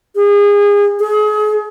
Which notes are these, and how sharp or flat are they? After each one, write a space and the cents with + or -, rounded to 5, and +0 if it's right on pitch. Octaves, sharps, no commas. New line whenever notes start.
G#4 -30
G#4 +35